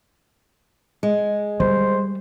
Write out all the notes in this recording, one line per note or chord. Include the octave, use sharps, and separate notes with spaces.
G#3
G3 C5